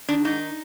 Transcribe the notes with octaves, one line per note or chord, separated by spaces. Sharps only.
D#3 D4
G#2 D#4